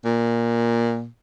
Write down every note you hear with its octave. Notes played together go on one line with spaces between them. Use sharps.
A#2